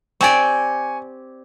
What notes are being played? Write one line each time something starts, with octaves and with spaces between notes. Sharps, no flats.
C4 G4 D5 G#5 C#6